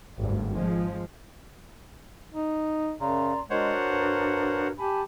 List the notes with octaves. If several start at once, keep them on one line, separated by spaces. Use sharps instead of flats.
G#1 D2 G2
F3 G#3
D#4
F#2 C#3 D5 A#5 C6
G#3 D4 F#4 A#4 C5 C#5 F#5
G2
G4 G#5 A5 B5